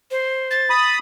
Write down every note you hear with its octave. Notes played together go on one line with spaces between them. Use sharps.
C5
A6
B5 D#6